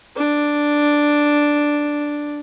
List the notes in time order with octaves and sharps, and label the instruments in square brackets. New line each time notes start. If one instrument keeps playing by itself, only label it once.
[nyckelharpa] D4